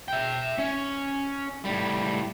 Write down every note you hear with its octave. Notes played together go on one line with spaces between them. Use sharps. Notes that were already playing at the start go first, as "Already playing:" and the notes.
E5 G5
C#4
A2 G3